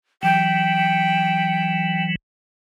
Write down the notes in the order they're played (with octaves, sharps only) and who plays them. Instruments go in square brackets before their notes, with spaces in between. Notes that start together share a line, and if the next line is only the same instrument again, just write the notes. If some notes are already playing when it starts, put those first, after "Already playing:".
[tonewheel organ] E3 F#3 [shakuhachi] G5